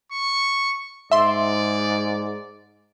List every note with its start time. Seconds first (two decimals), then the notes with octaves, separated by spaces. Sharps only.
0.12 C#6
1.11 G#2 D5 E5 C6